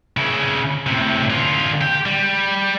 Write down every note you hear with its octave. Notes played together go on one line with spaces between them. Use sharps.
C#3 E4
A2 C3
D3 F4
G4
G3